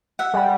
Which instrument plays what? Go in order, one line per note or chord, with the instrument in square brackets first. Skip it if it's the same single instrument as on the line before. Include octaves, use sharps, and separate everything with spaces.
[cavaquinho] E5 F#5
[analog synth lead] G3